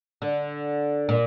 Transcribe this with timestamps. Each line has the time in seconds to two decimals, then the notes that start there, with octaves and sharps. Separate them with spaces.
0.22 D3
1.09 A#2